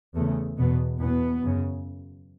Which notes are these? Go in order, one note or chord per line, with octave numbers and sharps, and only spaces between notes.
E2 C#3 A3
E2 B2 B3
E2 B2 B3
F#2 C#3